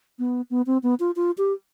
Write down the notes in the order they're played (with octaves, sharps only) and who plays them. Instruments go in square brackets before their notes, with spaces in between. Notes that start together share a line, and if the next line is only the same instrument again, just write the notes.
[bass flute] B3
B3
C4
B3
F4
F4
G4